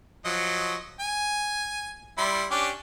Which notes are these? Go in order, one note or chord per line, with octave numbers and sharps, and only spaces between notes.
F3 F#3 D#5
G#5
G3 E4 C6
C#4 D4 G4